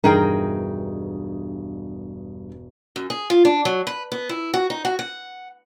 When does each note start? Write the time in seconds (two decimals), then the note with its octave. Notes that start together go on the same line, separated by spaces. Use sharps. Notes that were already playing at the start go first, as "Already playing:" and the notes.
0.04 E1 G2 D#4 G#4 A#4 G5
2.96 F#2
3.10 G#4
3.30 F4
3.45 D4
3.65 F#3
3.87 B4
4.12 B3
4.29 E4
4.54 F#4
4.70 D#4
4.85 F#4
4.99 F#5